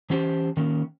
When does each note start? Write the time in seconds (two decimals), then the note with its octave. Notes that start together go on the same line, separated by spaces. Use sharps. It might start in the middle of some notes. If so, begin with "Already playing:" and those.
0.10 E3 C#4 G4 C5 A5
0.57 D#3 A#3 C#4